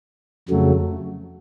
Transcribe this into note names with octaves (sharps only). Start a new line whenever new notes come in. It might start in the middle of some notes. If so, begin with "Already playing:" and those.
F2 C#3 F#3 A3